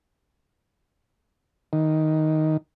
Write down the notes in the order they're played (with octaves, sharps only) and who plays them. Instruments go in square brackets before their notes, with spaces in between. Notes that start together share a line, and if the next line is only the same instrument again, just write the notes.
[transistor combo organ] D#3